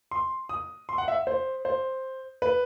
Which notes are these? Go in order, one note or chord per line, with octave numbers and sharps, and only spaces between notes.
C6
D#6
C6
F#5
E5
C5
C5
B4